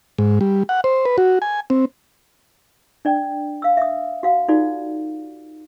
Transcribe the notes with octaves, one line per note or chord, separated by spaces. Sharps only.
G#2
G3
F#5
C5
B4
F#4
G#5
C4
D4 D5 G5
F5 E6
E5 D#6
F#4 F5 F#5
D#4 F4 F#4 A4 D5